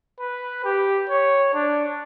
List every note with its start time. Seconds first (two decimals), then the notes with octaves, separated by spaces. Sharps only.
0.20 B4
0.65 G4
1.09 C#5
1.54 D4